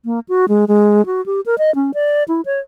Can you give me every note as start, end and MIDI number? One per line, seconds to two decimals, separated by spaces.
0.05 0.20 58
0.29 0.46 66
0.49 0.65 56
0.68 1.05 56
1.06 1.24 66
1.26 1.41 67
1.46 1.58 70
1.58 1.74 75
1.75 1.91 61
1.94 2.24 74
2.28 2.41 64
2.46 2.60 73